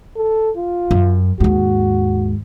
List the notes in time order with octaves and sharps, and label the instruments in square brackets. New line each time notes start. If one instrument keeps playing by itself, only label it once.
[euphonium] A4
F4
[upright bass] F#2
[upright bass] D#2 G#2 [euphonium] F#4